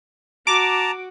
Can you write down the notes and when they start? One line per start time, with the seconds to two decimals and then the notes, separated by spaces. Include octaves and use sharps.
0.47 F#4 A5 A#5 D6